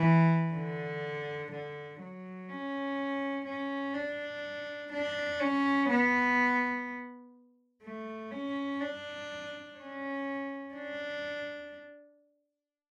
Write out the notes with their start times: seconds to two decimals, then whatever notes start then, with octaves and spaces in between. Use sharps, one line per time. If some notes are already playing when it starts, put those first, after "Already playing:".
Already playing: E3
0.53 D3
1.52 D3
2.00 F#3
2.49 C#4
3.45 C#4
3.94 D4
4.92 D4
5.40 C#4
5.88 B3
7.83 A3
8.31 C#4
8.80 D4
9.77 C#4
10.74 D4